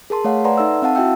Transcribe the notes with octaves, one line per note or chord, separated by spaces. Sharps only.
G#4 A#4 A5 C6
A3 C#5 F5 F#5
B4 D5 F#5 G#5 A#5 C6
D#4 A4 E5 E6
C4 F5 F#5 A5
E4 F#4 E5 F#5 G5 E6